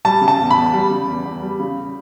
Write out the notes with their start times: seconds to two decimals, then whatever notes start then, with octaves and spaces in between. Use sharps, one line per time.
0.05 G3 A5
0.21 C#3
0.28 A5
0.39 E2
0.51 B5
0.56 E2
0.73 G3
0.91 C#3
1.08 E2
1.25 E2
1.42 G3
1.60 C#3